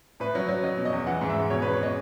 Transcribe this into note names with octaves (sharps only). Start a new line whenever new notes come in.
A2 B4
F#3
F#3
F#3 D#5
B2
D#5
E2
E3 F#5
G#2
E5
G#2
B2 C#5
E2 B4
C#5
B2 D#5